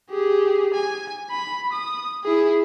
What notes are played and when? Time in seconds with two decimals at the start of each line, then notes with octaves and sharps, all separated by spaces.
0.11 G4 G#4
0.74 G#5
1.31 B5
1.73 D#6
2.25 E4 G#4